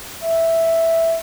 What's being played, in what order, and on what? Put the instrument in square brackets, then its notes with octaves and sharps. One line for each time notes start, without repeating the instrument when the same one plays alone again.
[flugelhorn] E5